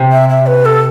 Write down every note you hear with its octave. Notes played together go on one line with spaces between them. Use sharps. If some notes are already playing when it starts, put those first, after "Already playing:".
Already playing: C3
E5
E5
B4
A4